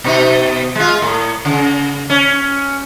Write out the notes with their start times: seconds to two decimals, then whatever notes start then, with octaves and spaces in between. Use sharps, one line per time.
0.04 B2 D#4
0.75 G#3 F4
1.02 A2
1.45 C#3
2.10 C#4